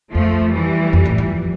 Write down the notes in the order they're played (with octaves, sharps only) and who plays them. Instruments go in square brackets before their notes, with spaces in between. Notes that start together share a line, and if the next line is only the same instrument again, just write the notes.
[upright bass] F2 [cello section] F3 A3
[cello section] E3 G3
[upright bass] F2
A2
F3